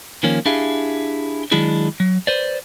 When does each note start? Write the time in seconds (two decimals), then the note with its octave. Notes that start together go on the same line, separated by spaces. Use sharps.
0.23 D#3 F3 A#3 C#4
0.46 D4 E4 G4 G#4 F5
1.52 D#3 F#3 G#3 D4 E4 G#4
2.00 F#3
2.27 B4 C5 D5